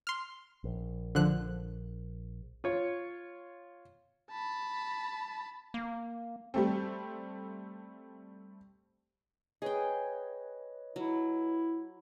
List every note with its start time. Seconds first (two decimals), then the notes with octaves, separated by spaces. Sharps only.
0.07 C6 F6
0.64 A#1
1.15 D3 F3 F#6
2.64 F4 C#5
4.31 A5 B5
5.74 A#3
6.54 G3 A3 C4
9.62 G#4 B4 C#5 D#5 G5
10.96 F#3 E4